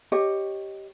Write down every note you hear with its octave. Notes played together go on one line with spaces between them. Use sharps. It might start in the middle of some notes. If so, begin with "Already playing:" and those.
G4 C#5 D#5